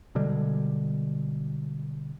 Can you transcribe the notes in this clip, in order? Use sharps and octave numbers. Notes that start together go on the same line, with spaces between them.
B2 D3 G3 G#3